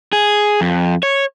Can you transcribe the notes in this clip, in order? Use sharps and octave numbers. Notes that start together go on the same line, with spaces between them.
G#4
F2
C#5